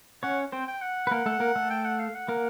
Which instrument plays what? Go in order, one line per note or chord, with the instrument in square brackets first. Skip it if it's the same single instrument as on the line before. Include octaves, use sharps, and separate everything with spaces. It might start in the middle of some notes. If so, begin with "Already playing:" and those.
[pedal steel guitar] C#4 C#5 [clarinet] F#5
[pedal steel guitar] C4 C5 [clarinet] G5
[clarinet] G5
F#5
[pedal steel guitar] B4
A#3 A#4
A3 A4
A#3 A#4
A3 A4
[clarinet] G5
F#5
F5
F#5
[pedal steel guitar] A#3 A#4 [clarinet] F#5